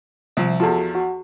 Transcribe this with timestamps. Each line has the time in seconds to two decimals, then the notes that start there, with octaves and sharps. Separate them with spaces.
0.37 C2 F3 E5
0.60 E2 F3 F#4 A4
0.95 F#4